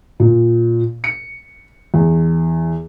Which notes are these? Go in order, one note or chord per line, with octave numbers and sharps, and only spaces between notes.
A#2
C#7
E2